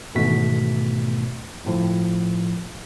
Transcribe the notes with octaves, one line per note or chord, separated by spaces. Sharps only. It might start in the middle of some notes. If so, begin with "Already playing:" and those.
G#1 E2 G#2 B2 A3 B6
G1 A2 F3